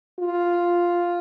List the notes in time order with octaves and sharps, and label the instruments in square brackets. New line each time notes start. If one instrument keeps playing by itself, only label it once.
[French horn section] F4